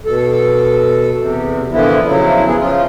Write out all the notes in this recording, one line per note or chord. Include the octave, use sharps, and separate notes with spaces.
B2 A4
E2 C3
A#2 D3 E3 F3 B3 E4
C#3 F3 F#3 E4
B3 G#4
C#3 F3 F4